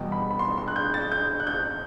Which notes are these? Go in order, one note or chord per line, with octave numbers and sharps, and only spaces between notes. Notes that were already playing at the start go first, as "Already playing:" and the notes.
Already playing: E2 B2 G3 G5
B5
B5
C6
C6
F#6
G6
A6
G6
F#6
G6